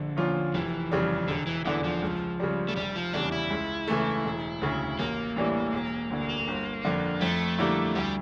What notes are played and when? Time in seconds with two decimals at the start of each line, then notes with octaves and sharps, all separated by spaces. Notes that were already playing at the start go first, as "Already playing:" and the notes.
Already playing: A#1 D3
0.17 A#2 F3 C#4 F4
0.54 F1 E3
0.92 F2 C#3 G3
1.28 E1 D3
1.47 E3
1.65 E2 D3 E3
1.84 F3
2.02 C#2
2.40 C#3 G3
2.68 A3
2.76 F1 G3
2.96 F3
3.13 E2 C#3 G3 D4
3.32 E4
3.50 C#2
3.87 C#3 E3 A3
4.24 E1
4.62 D2 C#3
4.99 A1 A#3
5.36 A2 E3 G3 D4
5.73 E1
6.10 D2 D3
6.48 G1
6.85 F2 D3
7.21 F2 A3
7.59 D3 G3 A#3 E4
7.95 D2 G3